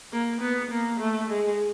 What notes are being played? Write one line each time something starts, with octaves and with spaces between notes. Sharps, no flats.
A#3
B3
A#3
A3
G#3